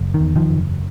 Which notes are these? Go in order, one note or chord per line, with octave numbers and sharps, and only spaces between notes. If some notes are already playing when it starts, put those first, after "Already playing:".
Already playing: F#1
D#3
E2
D#3 F3
F#1